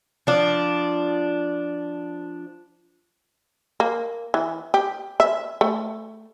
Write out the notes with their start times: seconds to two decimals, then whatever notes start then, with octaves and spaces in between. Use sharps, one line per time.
0.27 F3 D4
3.80 A#3
4.34 E3
4.74 G4
5.20 E5
5.61 A3